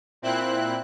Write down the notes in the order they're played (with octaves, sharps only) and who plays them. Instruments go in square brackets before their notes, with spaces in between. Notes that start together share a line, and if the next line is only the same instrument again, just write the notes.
[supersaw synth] A#2 C4 E4 F#6